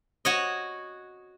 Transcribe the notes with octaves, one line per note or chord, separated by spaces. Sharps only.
F#4 C#5 D#5